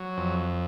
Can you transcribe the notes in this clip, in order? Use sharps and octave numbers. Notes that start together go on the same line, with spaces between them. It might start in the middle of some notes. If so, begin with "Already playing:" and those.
Already playing: F#3
F2